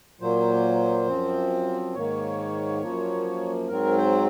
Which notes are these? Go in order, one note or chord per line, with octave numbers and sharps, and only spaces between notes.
A#2 F#3 A#3 C5
F#2 F3 C4
G#2 D#3 A#3 C#5
F#2 F3 A#3
G#2 F#3 C4 A#4
C5